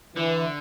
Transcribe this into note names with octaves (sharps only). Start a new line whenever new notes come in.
D3 E3